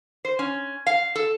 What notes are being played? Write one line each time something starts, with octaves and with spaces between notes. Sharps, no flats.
C5
C#4
F5
A4